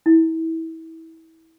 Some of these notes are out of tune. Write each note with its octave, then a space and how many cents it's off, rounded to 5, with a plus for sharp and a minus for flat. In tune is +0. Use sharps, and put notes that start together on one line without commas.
E4 -30